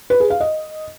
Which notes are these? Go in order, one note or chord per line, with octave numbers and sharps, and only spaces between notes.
B4
G#4
F5
D#5